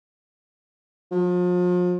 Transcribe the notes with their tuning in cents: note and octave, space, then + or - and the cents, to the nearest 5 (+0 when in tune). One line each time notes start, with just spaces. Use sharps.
F3 +40